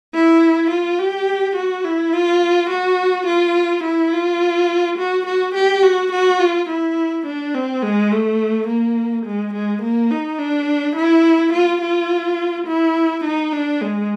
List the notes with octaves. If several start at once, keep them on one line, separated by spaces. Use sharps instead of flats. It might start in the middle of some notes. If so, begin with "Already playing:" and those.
E4
F4
G4
F#4
E4
F4
F#4
F4
E4
F4
F#4
F#4
G4
F#4
F#4
F4
E4
D4
C4
G#3
A3
A#3
G#3
G#3
A#3
D#4
D4
E4
F4
F4
E4
D#4
D4
G#3